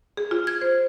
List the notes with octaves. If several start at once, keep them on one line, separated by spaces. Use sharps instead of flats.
G#4
F4
G#6
C5